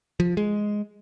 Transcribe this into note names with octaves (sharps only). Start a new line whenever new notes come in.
F3
G#3